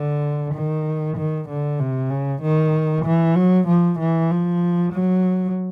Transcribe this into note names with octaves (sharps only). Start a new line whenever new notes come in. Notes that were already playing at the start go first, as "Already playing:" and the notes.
Already playing: D3
D#3
D#3
D3
C3
C#3
D#3
E3
F#3
F3
E3
F3
F#3